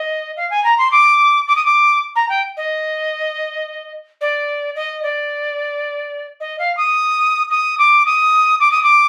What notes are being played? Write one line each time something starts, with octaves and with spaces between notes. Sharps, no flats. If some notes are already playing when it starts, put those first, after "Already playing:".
Already playing: D#5
F5
G#5
A#5
C6
D6
D6
D#6
D6
A#5
G5
D#5
D5
D#5
D5
D#5
F5
D#6
D#6
D6
D#6
D6
D#6
D6